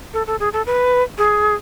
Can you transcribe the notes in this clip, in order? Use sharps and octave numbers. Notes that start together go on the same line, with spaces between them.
A4
A4
G#4
A4
B4
G#4